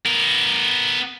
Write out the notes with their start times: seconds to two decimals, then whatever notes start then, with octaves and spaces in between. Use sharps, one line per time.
0.05 B3 A#4